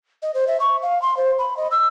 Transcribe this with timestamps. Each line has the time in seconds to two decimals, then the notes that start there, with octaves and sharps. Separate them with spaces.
0.22 D#5
0.34 C5
0.47 E5
0.60 C#6
0.82 F5
1.02 C6
1.17 C5
1.38 B5
1.57 D#5
1.71 E6